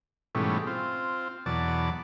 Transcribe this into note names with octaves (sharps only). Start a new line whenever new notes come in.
G#2 B2 E3 G3 A3 C#4
C4 F4
E2 B2 F#3 D5 A5